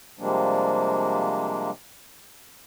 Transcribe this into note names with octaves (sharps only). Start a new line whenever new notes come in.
C3 F3 G3 G#3 A#3 D4